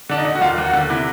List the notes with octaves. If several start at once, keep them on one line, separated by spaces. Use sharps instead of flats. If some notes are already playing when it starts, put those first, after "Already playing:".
D3 D4
D#4
D3
F#4
D#2 F4
D#2
F#4
D3
C3 E4